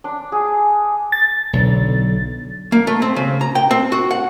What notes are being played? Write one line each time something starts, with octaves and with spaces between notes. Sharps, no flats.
D4
G#4
A6
B1 D3
A#3
A3
C4
C#3
A#5
G5
C4
F#4
F#5